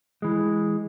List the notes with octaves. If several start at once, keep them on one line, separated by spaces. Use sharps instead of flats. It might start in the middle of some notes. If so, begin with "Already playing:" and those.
E3 G#3